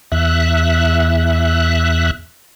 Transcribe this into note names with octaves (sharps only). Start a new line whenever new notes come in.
E2 E5 F#6